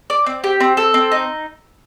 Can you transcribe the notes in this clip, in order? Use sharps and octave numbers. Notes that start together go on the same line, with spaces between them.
D5
C4
G4
C4
A4
C4
D#4